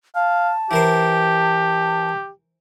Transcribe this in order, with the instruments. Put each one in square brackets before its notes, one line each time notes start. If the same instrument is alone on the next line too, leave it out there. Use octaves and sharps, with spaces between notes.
[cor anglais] F5 [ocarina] A5
[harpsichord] E3 A#4 C5 [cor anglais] G4